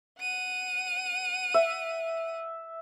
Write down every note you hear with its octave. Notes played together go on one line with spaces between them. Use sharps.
F#5 D#7
E5